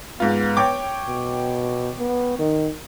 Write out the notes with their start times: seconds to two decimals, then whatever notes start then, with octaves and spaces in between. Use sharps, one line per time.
0.20 G#2 B3 F4
0.57 C#5 G5 D6
1.08 B2
1.99 B3
2.39 D#3